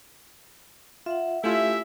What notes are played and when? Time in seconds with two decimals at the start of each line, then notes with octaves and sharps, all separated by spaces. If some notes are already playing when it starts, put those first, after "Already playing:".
1.06 F4 E5 F#5
1.44 A3 C#4 E4 F4 G4 E5